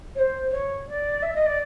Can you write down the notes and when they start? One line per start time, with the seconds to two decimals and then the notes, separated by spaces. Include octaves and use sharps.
0.15 C#5
0.18 C5
0.51 C#5
0.86 D5
1.22 E5
1.34 D#5
1.45 D5